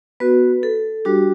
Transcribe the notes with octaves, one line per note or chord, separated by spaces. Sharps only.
B3 F#4 B4
A4
G3 D4 F#4 G4